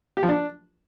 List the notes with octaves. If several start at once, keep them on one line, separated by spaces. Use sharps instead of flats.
G4
F3
D4